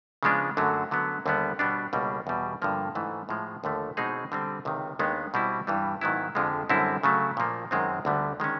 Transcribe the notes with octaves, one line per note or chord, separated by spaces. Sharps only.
C#3 F3 G#3 B3 D4
F#2 D3 F#3 A3
D3 F#3 B3
D#2 D3 G3 B3
B2 G3 B3 D4
C#2 B2 G3 A#3
E2 B2 G3
G2 D3 F3 A#3
G#2 E3 A3
A2 F3 G#3
D#2 D3 F3 A3
B2 G#3 C4 D#4 G#4
D3 G3 C4
C#2 C3 D#3
D#2 D#3 G#3 B3 D4
B2 G3 C4 E4
G2 E3 G3
G#2 D#3 F#3 B3 E4
F2 D3 F3 G#3
F#2 D3 G3 C4 E4
C#3 F#3 A3
A#2 F3 A#3
F#2 D#3 G#3 C4
D2 D3 G3 B3
D#3 G#3 C#4